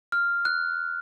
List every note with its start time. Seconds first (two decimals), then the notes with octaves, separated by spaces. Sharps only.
0.12 F6
0.45 F#6